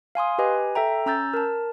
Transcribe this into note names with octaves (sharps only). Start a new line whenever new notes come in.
F5 G#5 C6 D#6
G4 B4 D#5 G#5
A4 E5 G5 A#5
C#4 A#5 E6 G6 A6
A#4 A5